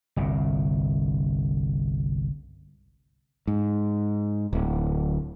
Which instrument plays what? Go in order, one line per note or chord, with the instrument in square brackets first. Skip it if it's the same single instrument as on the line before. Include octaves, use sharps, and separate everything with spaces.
[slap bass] G1 C2 A#2
[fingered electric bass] G#2
D1